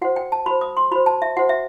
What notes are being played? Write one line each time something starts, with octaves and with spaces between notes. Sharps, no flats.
F#4 C5 F#5
G5
A5
F#4 C5 B5
D#6
C6
F#4 C5 B5
A5
E5
F#4 C5 F#5
E5